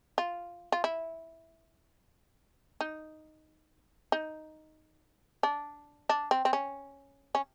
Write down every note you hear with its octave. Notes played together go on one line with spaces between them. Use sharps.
F4
F4
E4
D#4
D#4
D4
D4
C4
C4
C#4
C#4